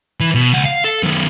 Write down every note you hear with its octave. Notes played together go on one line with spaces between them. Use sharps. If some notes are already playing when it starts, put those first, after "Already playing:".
E3
B2
C#2 F#5
F5
A4
F#2 D#3